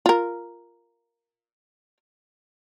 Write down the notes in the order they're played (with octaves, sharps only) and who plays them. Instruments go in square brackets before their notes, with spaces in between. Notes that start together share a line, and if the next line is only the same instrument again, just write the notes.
[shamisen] F4 A#4